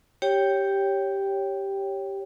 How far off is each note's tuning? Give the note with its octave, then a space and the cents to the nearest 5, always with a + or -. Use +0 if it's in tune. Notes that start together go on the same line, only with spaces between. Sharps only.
G4 +0 C#5 +0 G5 +0